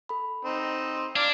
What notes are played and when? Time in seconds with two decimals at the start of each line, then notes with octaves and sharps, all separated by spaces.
0.09 A4 B5
0.45 C4 D#4
1.16 D4 D5 F5 G#6